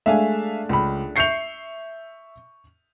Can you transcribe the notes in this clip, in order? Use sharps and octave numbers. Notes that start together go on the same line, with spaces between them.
G#3 A3 D4 E5 F5 G#5
C#2 B5
E5 C#6 G6 C7 C#7 F7